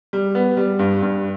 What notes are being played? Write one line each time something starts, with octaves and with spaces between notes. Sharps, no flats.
G3
B3
G3
G2
G2